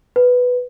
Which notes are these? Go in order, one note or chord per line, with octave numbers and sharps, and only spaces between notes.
B4